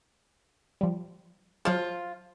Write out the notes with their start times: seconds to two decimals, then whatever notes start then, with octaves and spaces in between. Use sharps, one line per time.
0.81 F3 G3
1.65 F3 F#3 G#3 F4